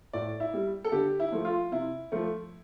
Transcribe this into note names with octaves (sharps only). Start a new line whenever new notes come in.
A2 D5
E4
G3
A4
D3 G4
E4
F3 A3
F4
C3 E4
F3 A3